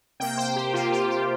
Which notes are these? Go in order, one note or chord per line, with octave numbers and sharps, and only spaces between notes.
C3 A#3 G5
C5
G4
C3 A#3 F4
G4
G4